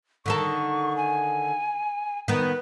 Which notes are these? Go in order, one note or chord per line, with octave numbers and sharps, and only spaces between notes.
D3 D#3 A4 C#6
G#5
D#3 B3 B4